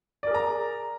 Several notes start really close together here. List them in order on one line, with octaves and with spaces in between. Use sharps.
D5 A#4 G#4 A#5